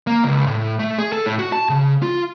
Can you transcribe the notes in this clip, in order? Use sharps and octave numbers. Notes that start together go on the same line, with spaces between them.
A#3
C#2
A2
A3
G#4
A4
A2
F#4
A5
C#3
F4